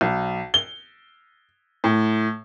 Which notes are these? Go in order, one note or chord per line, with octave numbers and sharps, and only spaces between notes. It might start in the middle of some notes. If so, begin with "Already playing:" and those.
B1
G7
A2